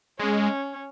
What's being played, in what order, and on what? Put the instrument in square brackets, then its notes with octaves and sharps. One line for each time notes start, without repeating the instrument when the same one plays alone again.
[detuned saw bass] G#3 [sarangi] C#4